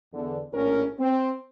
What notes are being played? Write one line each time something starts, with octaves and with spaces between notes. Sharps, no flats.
E2 D3
A#1 A2 C#4 A#4
C4